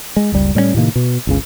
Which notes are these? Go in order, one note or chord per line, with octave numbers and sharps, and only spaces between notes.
G#3
F#1 C#2 G3
A2 G3 A#3 C#4
A2 C3 D#3 A#3
B2
G1 C#2 C#3